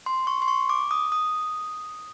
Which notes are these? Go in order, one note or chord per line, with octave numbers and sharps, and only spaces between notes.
C6
C#6
C6
C#6
D6
D#6
D#6